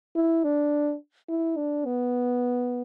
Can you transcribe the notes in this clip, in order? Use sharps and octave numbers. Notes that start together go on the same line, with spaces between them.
E4
D4
E4
D4
B3